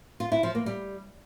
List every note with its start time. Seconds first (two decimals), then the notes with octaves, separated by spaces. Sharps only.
0.20 F4
0.32 E4
0.43 F3
0.55 A#3
0.66 G3